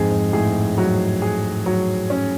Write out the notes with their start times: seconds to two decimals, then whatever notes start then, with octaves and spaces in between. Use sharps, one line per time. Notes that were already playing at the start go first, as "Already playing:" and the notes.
Already playing: F2 G#2 G#4
0.11 G#2
0.33 A2 G#4
0.78 F#3
1.22 G#4
1.66 F#3
2.10 C#4